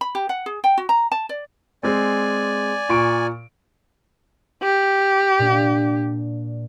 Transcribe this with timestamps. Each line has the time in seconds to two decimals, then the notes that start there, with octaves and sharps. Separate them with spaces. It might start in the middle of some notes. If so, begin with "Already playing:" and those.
0.01 B5
0.15 G4
0.29 F#5
0.46 G#4
0.64 G5
0.78 F#4
0.89 A#5
1.12 A5
1.29 D5
1.83 G#3 C4 D5 G#5
2.89 A#2 C#6 D7
4.63 G4
5.39 A#2 D4